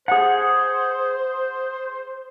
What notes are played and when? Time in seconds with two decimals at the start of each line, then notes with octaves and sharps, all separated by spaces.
0.08 G#4 C5 F#5